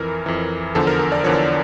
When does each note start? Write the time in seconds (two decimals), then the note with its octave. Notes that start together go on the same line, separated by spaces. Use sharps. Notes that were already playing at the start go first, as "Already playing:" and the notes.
Already playing: F2 E3 A#4
0.26 F2 E3
0.75 E2 D3 F3 A4
0.87 A#4
0.99 A#4
1.12 D5
1.24 E2 D3 F3 C#5